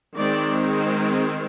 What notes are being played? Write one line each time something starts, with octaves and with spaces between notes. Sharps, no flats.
D#3 G#3 C4 D5